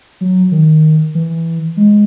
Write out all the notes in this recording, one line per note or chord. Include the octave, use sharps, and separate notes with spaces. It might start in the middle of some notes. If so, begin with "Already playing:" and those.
F#3
D#3
E3
G#3